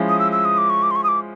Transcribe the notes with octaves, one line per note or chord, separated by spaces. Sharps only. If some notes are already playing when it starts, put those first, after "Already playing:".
Already playing: F3 G#3 C#4 E4
D#6
E6
E6
D#6
D6
C#6
D6
C6
C#6
D#6
D6